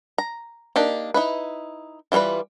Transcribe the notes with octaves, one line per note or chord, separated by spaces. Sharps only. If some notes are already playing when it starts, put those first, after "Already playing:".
A#5
A#3 D4 D#4 G4
D#4 E4 B4
E3 G3 C#4 F4 B4